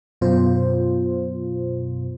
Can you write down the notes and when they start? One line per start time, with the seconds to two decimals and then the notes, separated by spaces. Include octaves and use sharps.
0.21 F#2 B2 F4 C5